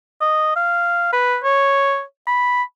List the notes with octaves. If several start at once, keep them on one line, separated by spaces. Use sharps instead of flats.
D#5
F5
B4
C#5
B5